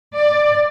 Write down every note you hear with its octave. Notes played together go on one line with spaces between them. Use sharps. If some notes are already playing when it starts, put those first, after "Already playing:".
D5